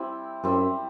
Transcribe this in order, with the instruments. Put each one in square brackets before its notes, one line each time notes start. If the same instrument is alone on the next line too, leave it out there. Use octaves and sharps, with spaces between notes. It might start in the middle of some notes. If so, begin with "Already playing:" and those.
Already playing: [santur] G3 C4 E4
[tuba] F#2 [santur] G3 C4 E4